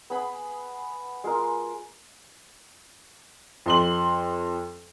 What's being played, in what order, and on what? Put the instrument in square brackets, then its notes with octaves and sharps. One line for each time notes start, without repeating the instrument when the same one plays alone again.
[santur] B3 G#4 B5
G#3 F4 A#4
[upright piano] F2 C6 F#7